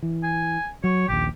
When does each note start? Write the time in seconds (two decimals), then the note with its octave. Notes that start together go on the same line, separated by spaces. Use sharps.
0.03 E3
0.24 G#5
0.84 F#3 C#5
1.08 A#1 D#2 G4